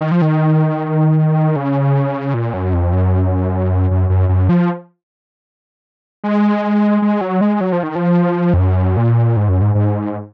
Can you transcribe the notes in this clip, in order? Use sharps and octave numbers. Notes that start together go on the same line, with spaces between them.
D#3
F3
D#3
C#3
A#2
F#2
F2
F#2
F#2
F#2
F#2
F3
G#3
G#3
F#3
G#3
F#3
F3
D#3
F3
F2
F#2
A#2
G#2
F#2
G#2
G#2